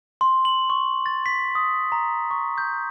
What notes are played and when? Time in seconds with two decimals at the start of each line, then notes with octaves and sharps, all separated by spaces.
0.21 C6
0.45 F#7
0.70 C#6
1.06 A6
1.26 B6
1.55 D#6
1.92 A#5
2.31 C#6
2.58 G6